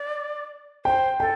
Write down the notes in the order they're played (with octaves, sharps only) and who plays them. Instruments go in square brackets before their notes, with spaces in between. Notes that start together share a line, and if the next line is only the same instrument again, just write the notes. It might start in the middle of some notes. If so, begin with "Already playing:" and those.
Already playing: [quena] D5
[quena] C5 [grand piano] G5
[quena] A4 [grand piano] G5